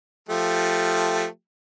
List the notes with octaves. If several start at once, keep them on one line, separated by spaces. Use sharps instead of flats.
F3 A3 G4